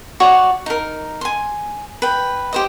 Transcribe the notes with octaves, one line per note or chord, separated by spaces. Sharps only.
F#4 C#5 D5
D#4 A#4
G#5 C6
B4 G5
G4 C5 D#5